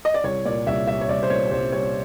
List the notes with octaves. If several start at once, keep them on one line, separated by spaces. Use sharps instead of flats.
D#5
D5
C2 C#5
A#2 D5
C2 E5
G3 E5
C#5
C2 D5
C5
A#2 C#5
C2 C5
G3 C#5